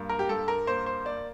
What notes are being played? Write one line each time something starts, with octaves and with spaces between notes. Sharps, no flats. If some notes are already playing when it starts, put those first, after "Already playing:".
Already playing: G2 A#3
A#4
G4
G2 A4
A#4
A#3 C5
C5
A#3 D5